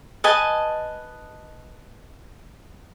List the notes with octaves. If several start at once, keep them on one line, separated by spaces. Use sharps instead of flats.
B4 D#5 G#5 A5